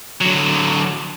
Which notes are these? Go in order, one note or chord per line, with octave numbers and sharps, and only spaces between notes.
D3 F#3